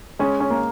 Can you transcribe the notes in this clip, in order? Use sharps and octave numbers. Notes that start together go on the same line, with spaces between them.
G#3 C#4
C#4
A#3